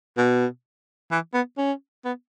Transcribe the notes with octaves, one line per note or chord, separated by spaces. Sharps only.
B2
E3
B3
C#4
B3